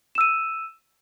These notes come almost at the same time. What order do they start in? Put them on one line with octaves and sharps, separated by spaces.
E7 E6 D#7